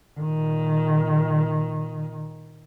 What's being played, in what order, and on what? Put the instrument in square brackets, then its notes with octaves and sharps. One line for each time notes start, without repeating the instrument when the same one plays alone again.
[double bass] A#2 D#3